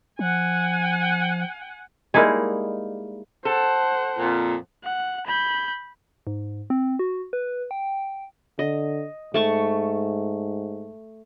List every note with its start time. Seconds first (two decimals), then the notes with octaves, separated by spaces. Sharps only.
0.19 F3 F#5 G#5
2.14 G3 G#3 A#3 D#4 E4 G#4
3.45 A4 C5 F#5
4.18 F2 A#2
4.84 F#5
5.26 B5 G6
6.27 G#2
6.70 C4
6.99 F#4
7.33 B4
7.71 G5
8.59 D3 D#5
9.34 G#2 A3 A5 C#6